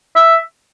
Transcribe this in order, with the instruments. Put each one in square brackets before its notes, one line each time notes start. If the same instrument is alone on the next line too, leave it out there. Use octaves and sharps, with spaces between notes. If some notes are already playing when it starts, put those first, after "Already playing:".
[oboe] E5